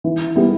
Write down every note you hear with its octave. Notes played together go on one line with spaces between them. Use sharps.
E3
G3 B3 E4